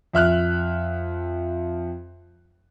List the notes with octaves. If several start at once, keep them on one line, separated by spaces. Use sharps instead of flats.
F2 E5 F6 F#6